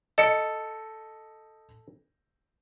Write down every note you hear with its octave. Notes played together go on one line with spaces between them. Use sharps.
A4 D#5 C#7